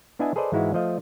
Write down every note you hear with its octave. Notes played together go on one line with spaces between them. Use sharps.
B3 D4 E4 D#5 E5 G#5
G#4 A4 B4 C5 D5 D#5
G#2 E3 G#3 E4 F#4 F5
F3 A3 D#5 F5